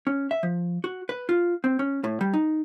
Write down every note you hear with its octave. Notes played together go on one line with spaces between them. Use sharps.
C#4
E5
F3
F#4
B4
F4
C4
C#4
A2
G3
D#4